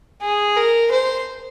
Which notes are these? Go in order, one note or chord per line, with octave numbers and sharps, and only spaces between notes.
G#4
A#4
C5